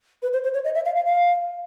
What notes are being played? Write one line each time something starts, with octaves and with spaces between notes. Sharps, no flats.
B4
C5
C5
C#5
D#5
E5
F5
F5
F5